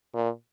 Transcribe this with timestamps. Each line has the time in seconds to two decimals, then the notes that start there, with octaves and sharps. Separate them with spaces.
0.15 A#2